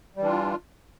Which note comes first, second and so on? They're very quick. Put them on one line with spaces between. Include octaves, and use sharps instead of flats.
G3 E3 D4 F4